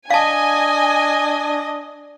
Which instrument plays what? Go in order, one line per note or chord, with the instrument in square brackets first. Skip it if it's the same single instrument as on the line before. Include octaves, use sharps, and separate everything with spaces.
[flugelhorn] D4 [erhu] D#5 [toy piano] F5 A5 [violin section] G#5